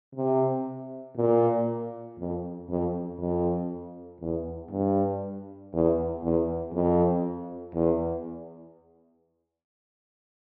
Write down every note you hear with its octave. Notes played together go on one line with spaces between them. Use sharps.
C3
A#2
F2
F2
F2
E2
G2
E2
E2
F2
E2